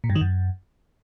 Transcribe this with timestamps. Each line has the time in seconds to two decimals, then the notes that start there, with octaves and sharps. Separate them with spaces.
0.04 A#2
0.10 G2
0.15 D#3
0.21 F#2